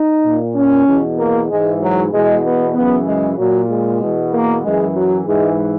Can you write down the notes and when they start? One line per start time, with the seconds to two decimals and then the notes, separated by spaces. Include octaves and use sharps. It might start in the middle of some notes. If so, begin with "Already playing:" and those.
Already playing: D#4
0.23 A#2
0.55 C#4
0.87 E2 B2
1.18 A#3
1.49 G#2 E3 G#3
1.80 F#3
2.12 E2 B2 G#3
2.44 B3
2.75 F#2 C#3 E3 B3
3.06 G#3
3.37 A#2 F#3
3.69 G#3
4.00 E2 B2
4.32 A#3
4.63 F#2 E3 G#3
4.94 F#3
5.26 G#2 E3 G#3